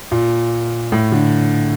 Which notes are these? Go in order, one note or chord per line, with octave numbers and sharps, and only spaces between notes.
A#2
A2
D3